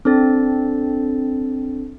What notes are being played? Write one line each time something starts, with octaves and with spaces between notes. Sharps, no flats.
C4 D4 A4 A6